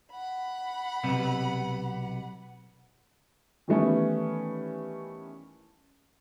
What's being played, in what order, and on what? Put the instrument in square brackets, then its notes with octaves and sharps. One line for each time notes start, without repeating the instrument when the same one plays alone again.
[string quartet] F#5 B5
[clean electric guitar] B1 C3 B3
[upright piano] D#3 E3 G3 A3 B3 C#4